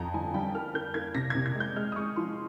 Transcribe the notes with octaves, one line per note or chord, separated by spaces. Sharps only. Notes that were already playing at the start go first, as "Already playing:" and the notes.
Already playing: F2 A#5
G1 G#5
G3 G5
A#3 F6
A#3 G6
A#3 G#6
C3 A#6
C3 G#6
G#6
G#3
G6
G#3 F6
D#6
G#3 C#6
F3 C6